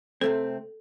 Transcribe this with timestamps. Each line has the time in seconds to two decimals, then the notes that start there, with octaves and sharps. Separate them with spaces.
0.21 C3 A3 C4 A4